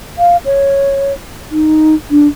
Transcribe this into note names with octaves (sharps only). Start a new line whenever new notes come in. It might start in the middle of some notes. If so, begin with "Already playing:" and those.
F5
C#5
D#4
D4